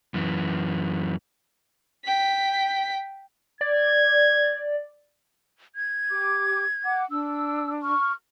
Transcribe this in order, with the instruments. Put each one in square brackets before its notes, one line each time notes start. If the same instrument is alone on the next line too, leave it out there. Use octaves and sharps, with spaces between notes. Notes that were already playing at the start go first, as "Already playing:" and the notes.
[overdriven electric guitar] F#2 E3
[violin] G5 B6
[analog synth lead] D5 [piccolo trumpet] G#6
[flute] G#6
[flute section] G4 D6
F#5 D6
[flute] D4 [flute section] E6
[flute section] C#6 F6